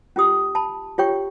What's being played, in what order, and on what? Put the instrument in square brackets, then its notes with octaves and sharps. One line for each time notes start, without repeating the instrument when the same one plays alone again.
[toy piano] C#4 F4 G4 D#6
A5 B5
F4 G4 C#5 G5 C#6